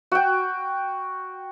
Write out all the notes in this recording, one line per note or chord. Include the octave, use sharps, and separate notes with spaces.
F#4 G5